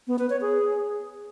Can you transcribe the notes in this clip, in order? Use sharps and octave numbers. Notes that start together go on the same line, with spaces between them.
B3
B4
C#5
G#4